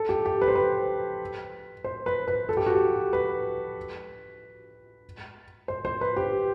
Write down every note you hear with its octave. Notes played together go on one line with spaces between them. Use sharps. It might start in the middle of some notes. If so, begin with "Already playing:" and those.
Already playing: A4
G4
G4
B4
C5
B4
C5
B4
B4
A4
G4
F#4
G4
B4
C5
C5
B4
G4